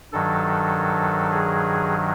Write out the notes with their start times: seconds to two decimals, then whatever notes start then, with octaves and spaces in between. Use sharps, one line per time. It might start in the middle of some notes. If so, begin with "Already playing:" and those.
0.13 G2 D#3 F#3 A4
1.32 G#4